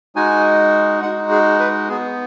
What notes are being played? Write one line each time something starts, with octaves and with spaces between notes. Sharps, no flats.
G#3 D#4 F#4 G#5
G#3 D#4 F#4 F#5
G#4
B4
B3 G#4